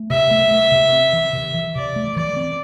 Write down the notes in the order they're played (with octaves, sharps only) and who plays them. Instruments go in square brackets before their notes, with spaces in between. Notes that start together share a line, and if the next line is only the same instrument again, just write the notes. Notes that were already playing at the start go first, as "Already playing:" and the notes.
Already playing: [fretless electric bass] A3
[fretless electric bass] C3 [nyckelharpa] E5
[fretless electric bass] A3
A3
C3
C4
E3
C3
E3
[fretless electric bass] C3 [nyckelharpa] D5
[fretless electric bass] A3
[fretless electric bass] E3 [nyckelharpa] D5
[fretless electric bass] C4